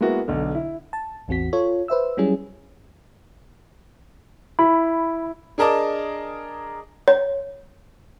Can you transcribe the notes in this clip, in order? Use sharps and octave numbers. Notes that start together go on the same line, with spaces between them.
G#3 A#3 B3 E4 F#4
B1 D3
E4
A5
A1 E2 C4 F#4 B6
F4 A4 C#5
B4 C5 E5 E6
F#3 G3 C#4 E4 G#4
E4 B5
D4 G#4 A#4 D#5 A5 D6
C#5